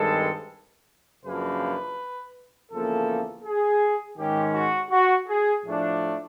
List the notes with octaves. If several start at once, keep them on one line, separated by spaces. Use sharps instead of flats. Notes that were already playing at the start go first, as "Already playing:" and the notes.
Already playing: G2 D#3 G#3 C4 A4
F#2 C#3 F3 A#3 D4 B4
E2 C#3 F3 A#3 A4
G#4
G#2 D#3 G#3 C#4 G4
F#4
F#4
G#4
A2 F3 A3 D4